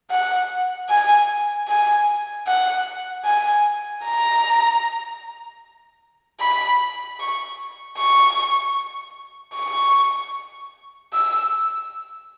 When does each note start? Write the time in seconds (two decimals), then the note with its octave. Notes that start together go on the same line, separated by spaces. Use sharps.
0.11 F#5
0.89 G#5
1.68 G#5
2.47 F#5
3.25 G#5
4.05 A#5
6.40 B5
7.20 C#6
7.97 C#6
9.55 C#6
11.13 E6